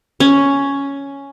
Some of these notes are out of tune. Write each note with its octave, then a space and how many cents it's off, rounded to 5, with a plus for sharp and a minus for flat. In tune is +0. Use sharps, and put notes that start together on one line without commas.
C#4 +5